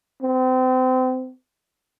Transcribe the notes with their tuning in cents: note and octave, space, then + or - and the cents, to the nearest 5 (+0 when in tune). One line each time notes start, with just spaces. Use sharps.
C4 -30